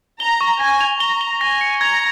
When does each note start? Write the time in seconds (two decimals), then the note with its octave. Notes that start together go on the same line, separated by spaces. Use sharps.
0.20 A#5 G7
0.41 C#6
0.60 G#5 A#6
0.81 F7
1.00 A#5 G7
1.21 G7
1.41 G#5 A#6
1.61 C#7
1.81 A#5 G#6